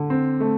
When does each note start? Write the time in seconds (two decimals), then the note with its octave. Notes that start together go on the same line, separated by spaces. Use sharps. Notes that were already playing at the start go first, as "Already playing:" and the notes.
Already playing: D3
0.10 C4
0.40 A3